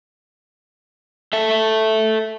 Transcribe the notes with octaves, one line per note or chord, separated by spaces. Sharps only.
A4 E5